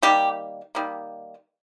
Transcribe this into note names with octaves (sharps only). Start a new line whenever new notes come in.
D#3 G3 A#3 G4
D#3 G3 A#3